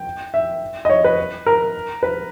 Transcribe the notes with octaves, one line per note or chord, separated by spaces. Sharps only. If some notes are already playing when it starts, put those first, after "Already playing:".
Already playing: G5
E5
D#5
C#5
B4
A#4
B4